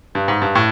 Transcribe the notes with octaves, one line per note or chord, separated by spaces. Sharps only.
G2
G#2
G2
A2